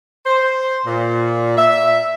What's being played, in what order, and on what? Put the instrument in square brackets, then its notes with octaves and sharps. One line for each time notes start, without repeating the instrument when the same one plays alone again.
[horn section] C5
A#2
E5